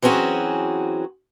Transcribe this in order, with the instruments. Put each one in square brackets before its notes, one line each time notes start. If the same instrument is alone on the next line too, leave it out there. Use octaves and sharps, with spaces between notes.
[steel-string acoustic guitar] E3 F#3 C4 C#4 F#4 G#4